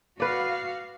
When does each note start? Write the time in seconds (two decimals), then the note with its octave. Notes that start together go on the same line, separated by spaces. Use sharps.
0.20 F#4 B4 D5 F5